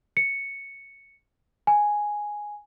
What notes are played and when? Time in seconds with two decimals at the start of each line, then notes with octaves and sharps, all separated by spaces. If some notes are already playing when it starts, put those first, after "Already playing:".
0.17 C#7
1.67 G#5